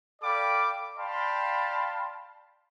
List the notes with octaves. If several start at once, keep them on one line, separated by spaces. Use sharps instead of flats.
A4 D5 F5 G5 B5 D6
D5 F5 G5 A5 B5 C6